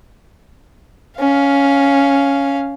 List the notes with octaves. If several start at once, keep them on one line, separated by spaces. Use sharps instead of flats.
C#4 F5